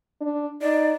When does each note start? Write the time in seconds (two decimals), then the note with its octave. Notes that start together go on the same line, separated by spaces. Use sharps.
0.21 D4
0.62 D#4 D5